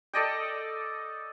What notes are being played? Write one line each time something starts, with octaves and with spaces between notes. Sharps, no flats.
A4 D5 D#5 G5